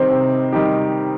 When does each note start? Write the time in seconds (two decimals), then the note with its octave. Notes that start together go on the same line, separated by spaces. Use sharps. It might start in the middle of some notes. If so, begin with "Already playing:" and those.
Already playing: C3 D#3 G3 C4 D#4 G4
0.11 C3
0.52 D#3 G3 D#4 G4